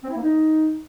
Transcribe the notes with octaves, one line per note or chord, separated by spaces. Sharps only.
C4
E4
A#3
D#4